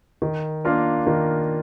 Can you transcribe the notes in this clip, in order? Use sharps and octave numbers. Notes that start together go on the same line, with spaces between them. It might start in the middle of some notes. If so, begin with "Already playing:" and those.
D#3
A#3 D4 F4 A#4
D#3